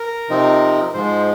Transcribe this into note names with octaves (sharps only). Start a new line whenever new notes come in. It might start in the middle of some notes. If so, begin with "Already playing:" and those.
Already playing: A#4
C3 F3 C4 D#4
G#2 F3 G#3 C5